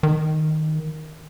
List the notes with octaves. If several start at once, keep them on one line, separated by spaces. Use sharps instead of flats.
D#3